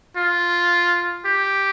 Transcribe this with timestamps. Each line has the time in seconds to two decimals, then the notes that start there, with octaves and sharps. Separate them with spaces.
0.17 F4
1.26 G4